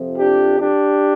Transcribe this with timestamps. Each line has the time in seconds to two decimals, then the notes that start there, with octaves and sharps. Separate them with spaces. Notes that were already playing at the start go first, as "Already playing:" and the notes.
Already playing: F2 C3 F3
0.19 D4 G4
0.61 D4 G4